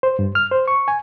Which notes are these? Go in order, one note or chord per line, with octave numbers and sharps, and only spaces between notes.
C5
G2
F6
C5
C#6
G#5